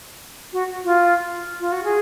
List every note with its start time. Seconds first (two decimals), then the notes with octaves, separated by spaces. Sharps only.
0.53 F#4
0.85 F4
1.60 F4
1.72 F#4
1.84 G#4